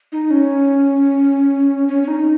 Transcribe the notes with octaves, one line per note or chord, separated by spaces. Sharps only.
D#4
C#4
C#4
C#4
D#4